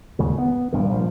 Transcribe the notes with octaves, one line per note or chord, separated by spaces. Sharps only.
D#2 G#2 C#3
B3
A#1 G2 D#3
A#1 F3